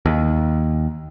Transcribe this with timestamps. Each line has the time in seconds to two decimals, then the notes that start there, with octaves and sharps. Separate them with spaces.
0.06 D#2